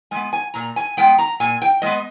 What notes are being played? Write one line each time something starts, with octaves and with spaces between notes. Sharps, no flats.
G#3 B3 G#5
G#5
A#2 A#5
G#5
G#3 B3 G5
A#5
A#2 G#5
G5
G#3 B3 D#5